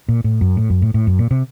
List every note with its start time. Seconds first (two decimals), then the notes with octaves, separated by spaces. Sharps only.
0.09 A#2
0.24 A2
0.41 F#2
0.57 A2
0.70 F#2
0.82 A2
0.94 A2
1.07 F#2
1.19 A#2
1.31 C3